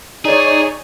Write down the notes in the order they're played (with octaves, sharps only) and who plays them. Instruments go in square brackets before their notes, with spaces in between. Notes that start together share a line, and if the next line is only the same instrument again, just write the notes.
[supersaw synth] D#4 C#5 [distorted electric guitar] G#4 [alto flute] D5